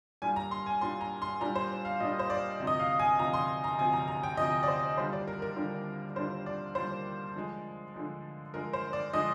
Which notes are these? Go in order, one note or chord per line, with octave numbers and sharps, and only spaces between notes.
A#2 G3 D4 F4 G#5
A#5
C6
G#5
A#2 G3 D4 F4 C6
A#5
C6
A#2 G3 D4 F4 A#5
C5
F5
A#2 G3 D4 F4 D#5
C5
D5
D2 C3 F3
D#5
F5
G#5
D2 C3 F3 A#5
C6
A#5
D2 C3 F3 G#5
A#5
A#5
G5
D2 C3 F3 D#5
D5
C5
D#2 D3 G3 D4 F4 C5
D5
A#4
A#4
D#2 D3 G3 D4 F4
D#2 D3 G3 D4 F4 C5
D5
D#2 D3 G3 D4 F4 C5
D3 F3 G#3
D3 F3 G#3
D3 F3 G#3 A#4
C5
D5
D3 F3 G#3 D#5